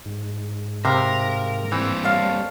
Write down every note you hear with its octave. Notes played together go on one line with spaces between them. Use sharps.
G#2
C3 A#4 C5 F5 B5
G2 E3 A#3 C4 G5
G3 A4 C#5 F5